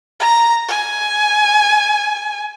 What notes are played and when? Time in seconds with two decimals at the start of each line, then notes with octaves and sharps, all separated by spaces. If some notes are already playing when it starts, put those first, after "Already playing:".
0.20 A#5
0.69 G#5